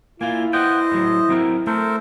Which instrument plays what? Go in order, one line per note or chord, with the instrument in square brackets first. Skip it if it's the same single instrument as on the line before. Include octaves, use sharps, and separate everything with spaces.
[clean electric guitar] A#3 F4 [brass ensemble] E4 [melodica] G#5
[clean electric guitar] B4 F#5 G5 [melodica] C5 D#5
[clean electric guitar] A2 F#3
F#3 C4 A#4
[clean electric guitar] A3 [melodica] A4 A#4 C5